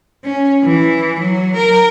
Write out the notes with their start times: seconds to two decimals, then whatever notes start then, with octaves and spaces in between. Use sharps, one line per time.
0.24 C#4
0.64 E3
1.19 F#3
1.56 A#4